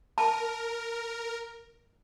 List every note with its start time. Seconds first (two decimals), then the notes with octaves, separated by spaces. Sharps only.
0.18 A#4 A5